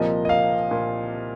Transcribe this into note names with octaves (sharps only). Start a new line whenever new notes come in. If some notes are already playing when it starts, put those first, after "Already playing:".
Already playing: C2 A#2 F3 A#3 D#5
D#5
F5
A#2